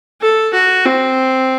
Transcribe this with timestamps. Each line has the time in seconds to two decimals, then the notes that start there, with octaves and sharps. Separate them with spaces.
0.21 A4
0.54 F#4
0.85 C4